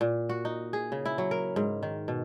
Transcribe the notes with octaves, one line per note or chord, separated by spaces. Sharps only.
A#2
F#4
D#4
G#4
C#3
E4
F#3
A#4
G#2
D#3
B2